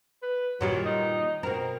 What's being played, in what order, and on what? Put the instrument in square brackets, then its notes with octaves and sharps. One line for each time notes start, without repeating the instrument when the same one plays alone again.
[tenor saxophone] B4
[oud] A#2 D#3 G3 [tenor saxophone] F#3
[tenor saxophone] D#4
[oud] B2 A#4 [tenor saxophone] C4